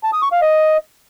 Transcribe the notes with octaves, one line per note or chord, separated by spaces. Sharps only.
A5
D#6
C#6
F5
D#5